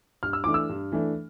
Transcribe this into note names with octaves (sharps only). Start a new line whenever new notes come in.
G2 F6
E6
E3 A3 D4 D6
E6
G2
E3 A3 D4